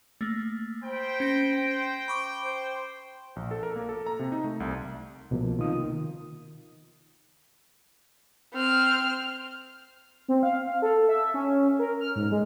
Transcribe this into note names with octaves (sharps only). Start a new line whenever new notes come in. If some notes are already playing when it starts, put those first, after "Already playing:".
A3 A#3
C5 G5 B5
C#4 A#6
G5
B5 C#6 D6
C5
A#1
A4
A#4
A#3
A4
A#5
C3
D#4
A3
C2
C2 B2 F3 A#3
C3 D#3 F4 D#6
D#3
C4 F6
C4
F5
F5
A4
E5
C#4
A#4
F6
G#2
G#3